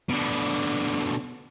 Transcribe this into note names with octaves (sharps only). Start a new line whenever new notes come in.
B2 D3